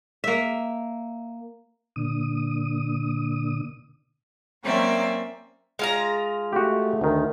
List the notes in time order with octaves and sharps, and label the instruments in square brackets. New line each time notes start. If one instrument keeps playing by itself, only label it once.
[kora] A#3 E5
[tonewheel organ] A#2 D3 D#6
[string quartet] F#3 A#3 C4 C#4 D5 E5
[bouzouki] G#3 F4 A#5
[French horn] A3 [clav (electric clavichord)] F#4 G4
[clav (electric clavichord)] D2 D#3